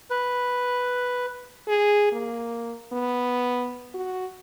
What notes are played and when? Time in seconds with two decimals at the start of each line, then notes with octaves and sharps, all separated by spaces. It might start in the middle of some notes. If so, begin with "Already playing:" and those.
0.10 B4
1.68 G#4
2.12 A#3
2.92 B3
3.94 F#4